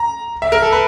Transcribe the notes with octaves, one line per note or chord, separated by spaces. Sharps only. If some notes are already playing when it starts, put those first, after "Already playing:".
Already playing: A#5
E5
A#4
A4
B4